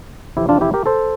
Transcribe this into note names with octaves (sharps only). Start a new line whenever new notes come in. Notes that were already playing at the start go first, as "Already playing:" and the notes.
F2 C3 E3 E4 G4
D4 F4
E4 G4
G4 A#4
A4 C5